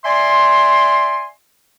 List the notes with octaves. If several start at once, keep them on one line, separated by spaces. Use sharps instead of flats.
D5 E5 G#5 C6